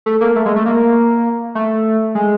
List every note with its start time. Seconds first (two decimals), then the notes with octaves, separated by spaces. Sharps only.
0.06 A3
0.21 A#3
0.36 A3
0.45 G#3
0.56 A3
0.66 A#3
1.55 A3
2.15 G#3